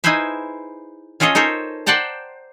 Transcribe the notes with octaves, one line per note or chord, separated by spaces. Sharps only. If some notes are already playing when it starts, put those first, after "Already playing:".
D#4 E4 G#4 B4 C5 E5
C#4 F4 G#4 A4 C#5 D#5
D#4 A4 A#4 C5 C#5
C5 D5 F#5 G5 A5 A#5